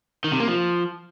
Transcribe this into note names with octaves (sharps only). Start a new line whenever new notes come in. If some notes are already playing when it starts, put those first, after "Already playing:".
D#3
C3
A#3
F3